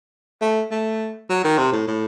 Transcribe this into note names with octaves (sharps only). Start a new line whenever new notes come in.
A3
A3
F#3
D#3
C3
A2
A2